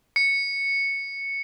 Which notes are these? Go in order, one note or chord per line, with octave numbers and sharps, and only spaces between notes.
C#7